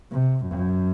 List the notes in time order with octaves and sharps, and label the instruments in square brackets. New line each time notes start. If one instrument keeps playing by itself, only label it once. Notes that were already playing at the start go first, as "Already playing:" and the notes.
[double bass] C3
F#2